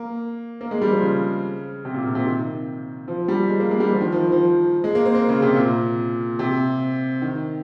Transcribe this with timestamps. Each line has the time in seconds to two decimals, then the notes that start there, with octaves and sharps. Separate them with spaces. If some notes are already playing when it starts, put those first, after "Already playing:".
Already playing: A#3
0.61 A#3
0.71 G#3
0.82 G3
0.91 F3
1.02 C#3
1.85 C3
1.94 A#2
2.06 A#2
2.15 C3
2.25 D#3
3.08 F3
3.28 G3
3.49 G#3
3.60 A#3
3.71 G#3
3.80 G3
3.92 F3
4.01 D#3
4.12 F3
4.32 F3
4.84 G#3
4.95 A#3
5.05 C4
5.15 A#3
5.29 C#3
5.42 C3
5.56 A#2
6.39 C3
7.22 D#3